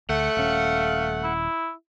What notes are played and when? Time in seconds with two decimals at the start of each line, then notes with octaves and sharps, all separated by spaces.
0.09 D2 A3 F#5
0.37 D#1 C#4 F5
1.24 E4